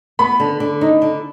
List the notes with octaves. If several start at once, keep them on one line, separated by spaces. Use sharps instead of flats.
B3 B5
D3
D3
D#4
D3